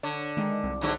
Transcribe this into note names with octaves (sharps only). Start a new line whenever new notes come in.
D3 C#5
D#3 G#3 D#4
C2
G#2 D3 F#3